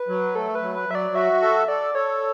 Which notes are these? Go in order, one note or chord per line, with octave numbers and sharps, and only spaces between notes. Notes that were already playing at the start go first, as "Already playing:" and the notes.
Already playing: B4
F#3
A3 A4
B4
F#3
B4
F#3 E5
D5
F#4 E5
A4 E5
A4 D5
A4 C#5